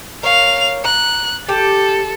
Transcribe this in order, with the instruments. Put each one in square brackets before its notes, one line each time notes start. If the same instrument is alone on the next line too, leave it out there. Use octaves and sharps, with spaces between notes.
[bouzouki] A#4 C#5 [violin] F5 F7
[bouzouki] A#5 [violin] F#6
[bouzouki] G4 [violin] A4